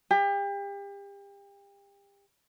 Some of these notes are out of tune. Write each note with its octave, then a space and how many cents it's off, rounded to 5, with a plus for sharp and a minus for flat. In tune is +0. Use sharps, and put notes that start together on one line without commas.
G4 +35